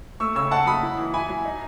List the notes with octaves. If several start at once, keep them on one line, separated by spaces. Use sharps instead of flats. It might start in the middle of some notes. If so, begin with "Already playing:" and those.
A3 C#6 E6
C#3 C#6 E6
D#4 F#5 A5
F#3 B5 D#6
E4
E3
E4 G#5 B5
F#3
D#4